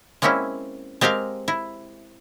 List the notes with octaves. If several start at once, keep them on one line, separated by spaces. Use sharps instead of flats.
G#3 A#3 C4 C#4 E4
G#3 C4 G4 A#4 F5
E4